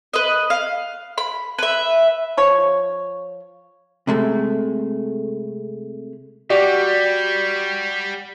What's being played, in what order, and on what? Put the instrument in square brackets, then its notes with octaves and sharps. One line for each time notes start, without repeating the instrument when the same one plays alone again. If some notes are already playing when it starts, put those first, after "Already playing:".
[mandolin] B4 D#5
F5
B5
B4 E5
[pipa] F3 C#5
[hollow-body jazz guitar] C3 G#3 A3
[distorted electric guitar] G3 [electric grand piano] F#4 G4 [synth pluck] D5